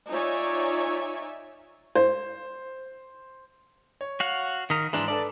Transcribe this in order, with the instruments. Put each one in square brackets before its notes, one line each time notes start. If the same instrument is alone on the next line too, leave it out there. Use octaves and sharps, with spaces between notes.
[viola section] D#4 F4 C#5 D5 E5 G#5
[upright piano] C5
[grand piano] C#5
[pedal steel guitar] F#4 F5 F#5
[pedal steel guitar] D#3 A#4 [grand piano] D#6 B6 D#7
[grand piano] G#2 C6 [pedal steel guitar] E3 D4
[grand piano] D4 A4 B4 [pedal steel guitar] D5